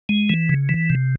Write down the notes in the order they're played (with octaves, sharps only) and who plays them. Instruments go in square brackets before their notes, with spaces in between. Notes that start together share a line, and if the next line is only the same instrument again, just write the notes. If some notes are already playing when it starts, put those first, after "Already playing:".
[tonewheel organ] G#3
E3
C#3
E3
C3